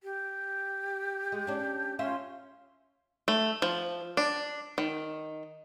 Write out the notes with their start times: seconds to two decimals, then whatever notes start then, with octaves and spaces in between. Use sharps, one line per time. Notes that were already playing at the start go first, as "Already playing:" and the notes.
0.03 G4
1.32 G#3
1.47 C#4 D4
1.99 C#4 F4 E5
3.28 A3
3.62 F3
4.17 D4
4.78 D#3